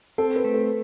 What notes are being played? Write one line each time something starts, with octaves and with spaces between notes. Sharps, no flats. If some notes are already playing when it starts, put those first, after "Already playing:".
C4 A4
B4
A3
A4